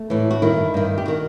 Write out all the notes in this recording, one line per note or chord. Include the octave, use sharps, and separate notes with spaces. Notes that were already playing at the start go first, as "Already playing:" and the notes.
Already playing: A3
A2 E3
F#4
G2 D#3 E4
G2 D#3
G4
D#3 F#4